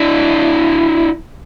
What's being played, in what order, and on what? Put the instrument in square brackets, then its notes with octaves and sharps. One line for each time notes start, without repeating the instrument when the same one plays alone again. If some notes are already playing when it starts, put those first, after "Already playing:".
Already playing: [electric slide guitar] D4 E4